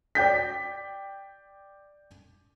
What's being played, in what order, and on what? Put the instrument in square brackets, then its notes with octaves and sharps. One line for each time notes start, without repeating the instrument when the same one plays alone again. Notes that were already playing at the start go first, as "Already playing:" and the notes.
[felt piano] D5 G5 G6 B6